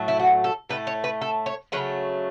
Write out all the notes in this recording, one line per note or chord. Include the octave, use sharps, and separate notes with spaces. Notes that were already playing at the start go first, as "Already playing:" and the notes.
Already playing: A2 F#3 A3
E4
F#4
A4
A2 A3 B4
C#5
B4
A4
C#5
C#3 F#3 A3 B4